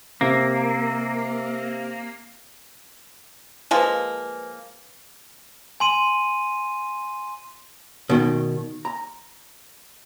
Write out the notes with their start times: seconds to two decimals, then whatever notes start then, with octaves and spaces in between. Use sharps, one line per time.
0.21 C3 A#3
3.71 F3 G#3 A#3 B4 G#5
5.80 G#5 C6 D#7
8.09 B2 D#3
8.85 A#5